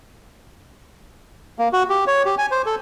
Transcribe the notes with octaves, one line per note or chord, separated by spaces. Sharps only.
A#3
F#4
G4
C#5
G4
G#5
C5
A4